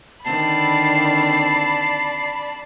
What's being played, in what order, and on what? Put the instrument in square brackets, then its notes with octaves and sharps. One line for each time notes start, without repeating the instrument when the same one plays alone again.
[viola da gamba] D3 D#3 C4 [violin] D5 B5 [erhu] A5 [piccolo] C7